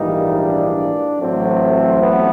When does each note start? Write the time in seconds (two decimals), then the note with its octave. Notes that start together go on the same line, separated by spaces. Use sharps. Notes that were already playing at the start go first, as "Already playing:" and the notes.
Already playing: A#1 G#2 E3 G3 A#3 D#4
0.41 D4
1.21 A1 A2 F#3 A3 C4
2.02 B3